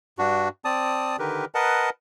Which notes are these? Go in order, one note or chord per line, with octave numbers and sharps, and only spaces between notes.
G2 D4 F#4
C4 D5 A5 D#6
D3 D#3 G4 A#4 B4
A#4 B4 D#5 F#5 A5